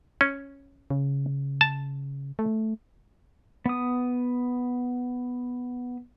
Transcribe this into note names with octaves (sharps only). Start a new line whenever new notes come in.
C#4
C#3
A5
A3
B3 D#6